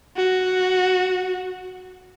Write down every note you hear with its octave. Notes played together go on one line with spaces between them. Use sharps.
F#4